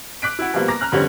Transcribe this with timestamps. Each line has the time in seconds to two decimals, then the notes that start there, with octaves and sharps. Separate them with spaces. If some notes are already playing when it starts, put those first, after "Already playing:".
0.22 D6 F#6 B6 D7
0.39 E4 F#4
0.54 B2 F3 G3 A#3 B3
0.68 A#5 D6 A#6
0.81 A#5 F6 F#6
0.92 F2 D3 G3 B3 C#4